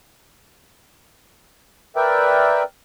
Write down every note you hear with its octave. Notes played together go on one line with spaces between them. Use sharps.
A#4 B4 D5 E5 G5